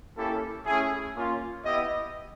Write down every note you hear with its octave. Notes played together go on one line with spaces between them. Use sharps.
A#3 C#4 E4 G4 A4
A3 C#4 E4 G#4
A#3 C#4 F4
B3 E4 G4 D#5